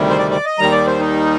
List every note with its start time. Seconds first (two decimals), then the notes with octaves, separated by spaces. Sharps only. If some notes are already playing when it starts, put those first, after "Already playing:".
Already playing: D2 C3 D#3 G3
0.10 C5
0.18 D5
0.31 D5
0.45 D#5
0.59 D#2 D#3 G3 A#5
0.72 D5
0.86 C5
0.99 D#4